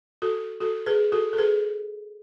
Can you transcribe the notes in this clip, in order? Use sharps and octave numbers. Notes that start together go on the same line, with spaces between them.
F#4 A4
F#4 A4
G#4 B4
F#4 A4
A4
G#4 B4